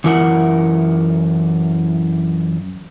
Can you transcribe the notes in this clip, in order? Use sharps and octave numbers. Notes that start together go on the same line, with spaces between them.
F#2 E3 E4 A#4 F#5